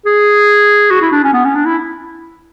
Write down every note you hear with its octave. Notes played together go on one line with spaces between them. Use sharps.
G#4
F#4
E4
D4
C#4
B3
C#4
D4
E4